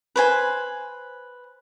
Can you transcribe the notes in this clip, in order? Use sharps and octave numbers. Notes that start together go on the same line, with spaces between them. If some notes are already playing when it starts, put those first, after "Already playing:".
B4 C5 G#5